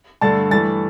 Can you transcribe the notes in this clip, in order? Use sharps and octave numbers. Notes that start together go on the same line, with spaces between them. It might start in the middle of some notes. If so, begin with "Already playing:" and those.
G2 D3 A3 A5 A6
G2 E3 A3 A5 A6